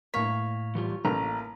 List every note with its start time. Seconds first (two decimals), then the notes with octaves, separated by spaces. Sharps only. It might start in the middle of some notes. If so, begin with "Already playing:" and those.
0.14 A2 A#3 C#5 F5 B6
0.75 E3 G3 F4
1.05 A1 A#3 A#5